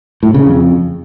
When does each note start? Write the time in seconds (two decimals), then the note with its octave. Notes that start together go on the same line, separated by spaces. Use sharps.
0.23 A2
0.34 C#3
0.46 F2